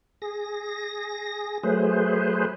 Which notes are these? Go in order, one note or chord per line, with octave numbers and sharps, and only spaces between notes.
G#4 A#6
F#3 A3 G#4 B4 C5